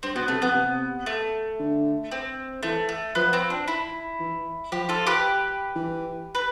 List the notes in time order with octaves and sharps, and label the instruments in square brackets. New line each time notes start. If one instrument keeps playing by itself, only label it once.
[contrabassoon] G2 [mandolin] C4
[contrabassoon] B2 [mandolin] B3
[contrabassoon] C3 [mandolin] A3
[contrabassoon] F2 [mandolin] B3
[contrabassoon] C3
[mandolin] A3
[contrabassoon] D3
[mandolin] C4
[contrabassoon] E3 [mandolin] A3
[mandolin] A3
[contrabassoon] F3 [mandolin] B3
[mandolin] C4
D4
E4
[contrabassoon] E3
[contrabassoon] F3 [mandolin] G4
[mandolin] F4 A4
G4 B4
[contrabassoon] E3
[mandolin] B4